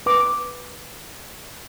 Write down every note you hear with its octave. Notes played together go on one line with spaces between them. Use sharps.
B4 D6